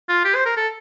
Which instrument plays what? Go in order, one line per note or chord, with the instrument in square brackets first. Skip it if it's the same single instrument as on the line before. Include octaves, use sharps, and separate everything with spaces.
[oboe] F4
G4
C5
A#4
A4